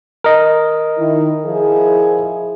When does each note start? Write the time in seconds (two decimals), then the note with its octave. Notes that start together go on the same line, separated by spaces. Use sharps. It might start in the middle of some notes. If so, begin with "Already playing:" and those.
0.24 A#4 D#5
0.98 D#3 E4
1.45 F3 E4 G#4